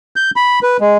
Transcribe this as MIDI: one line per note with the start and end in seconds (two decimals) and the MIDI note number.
0.16 0.31 91
0.36 0.59 83
0.63 0.77 71
0.80 0.97 56